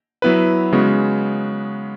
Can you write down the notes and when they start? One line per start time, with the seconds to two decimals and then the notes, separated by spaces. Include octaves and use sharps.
0.22 F#3 B3 E4 B4
0.72 C#3 G#3 B3 F#4